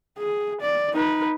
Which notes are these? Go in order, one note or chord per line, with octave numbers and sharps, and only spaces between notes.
G#4
D5
D#4 B4